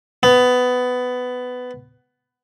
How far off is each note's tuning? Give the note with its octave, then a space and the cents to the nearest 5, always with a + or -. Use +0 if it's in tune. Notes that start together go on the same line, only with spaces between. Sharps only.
B3 +15